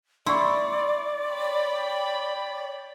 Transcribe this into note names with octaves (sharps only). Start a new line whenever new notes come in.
E4 D5 C6 C#6
C#5 G5 B5